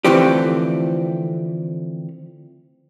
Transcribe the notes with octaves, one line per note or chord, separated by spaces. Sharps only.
D3 E3 F3 A3 C4 G4